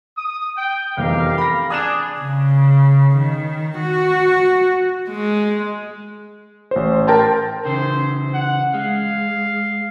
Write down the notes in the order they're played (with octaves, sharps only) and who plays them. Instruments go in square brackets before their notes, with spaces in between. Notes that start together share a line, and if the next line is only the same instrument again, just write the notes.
[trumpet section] D#6
G5
[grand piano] F1 E2 [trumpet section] G4 A#4 F5
[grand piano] B5 A#6
[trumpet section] D4 G#4 [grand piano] D#6 F#6 E7
[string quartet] C#3
D#3
F#4
[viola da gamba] G#3
[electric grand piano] A1 C5
A#4 G5 A5 C6
[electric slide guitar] C#3 E3 [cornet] C5
[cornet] F#5
[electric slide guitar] G#3 [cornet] F5